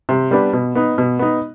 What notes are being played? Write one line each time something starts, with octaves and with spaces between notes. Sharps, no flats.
C3
G3 B3 D4
B2
B3 D#4
B2
B3 D#4